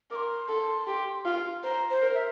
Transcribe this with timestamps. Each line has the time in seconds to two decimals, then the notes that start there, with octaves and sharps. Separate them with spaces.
0.11 A#4 D6
0.16 C6
0.49 A4
0.87 G4
1.26 F4
1.63 C5 A#5
1.90 C5
2.02 A#4
2.15 E5